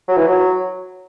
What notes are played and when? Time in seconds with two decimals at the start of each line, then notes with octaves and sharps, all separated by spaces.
0.08 F#3
0.17 E3
0.27 F#3